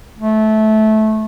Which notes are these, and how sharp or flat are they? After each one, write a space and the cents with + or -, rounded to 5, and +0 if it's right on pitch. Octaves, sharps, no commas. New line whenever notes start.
A3 -20